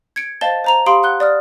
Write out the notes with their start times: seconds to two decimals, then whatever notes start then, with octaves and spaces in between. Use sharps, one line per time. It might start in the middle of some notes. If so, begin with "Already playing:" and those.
0.16 G#6 C#7 D7
0.41 C5 D#5 F5 A5 A6 G7
0.64 C5 A#5 F7
0.86 G4 F5 B5 C6 D#6 D7
1.03 F#5 F#6 G7
1.20 D5 D#6 F6